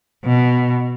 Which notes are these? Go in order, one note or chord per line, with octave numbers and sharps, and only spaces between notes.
B2